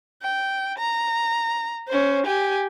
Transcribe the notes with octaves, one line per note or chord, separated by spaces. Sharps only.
G5
A#5
C#4 C5
G4 G#5